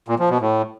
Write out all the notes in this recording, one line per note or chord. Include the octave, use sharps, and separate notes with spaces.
A#2
F3
B2
A2